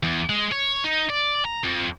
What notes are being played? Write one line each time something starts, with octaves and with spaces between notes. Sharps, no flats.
E2
G#3
C#5
D#4
D5
A#5
F2